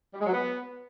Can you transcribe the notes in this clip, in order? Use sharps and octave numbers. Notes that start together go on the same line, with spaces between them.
G3
G#3
F#3
B3